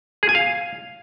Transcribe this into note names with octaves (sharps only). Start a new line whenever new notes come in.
G#4
G#5
F5